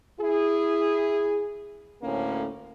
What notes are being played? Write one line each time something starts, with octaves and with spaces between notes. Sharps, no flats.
E4 G#4
D2 A2 A#3 C#4